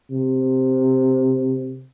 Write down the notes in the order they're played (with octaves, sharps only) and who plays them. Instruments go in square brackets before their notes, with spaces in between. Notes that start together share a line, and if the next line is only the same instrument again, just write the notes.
[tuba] C3